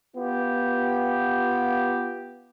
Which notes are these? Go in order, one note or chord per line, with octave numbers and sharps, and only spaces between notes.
B3 F4 G4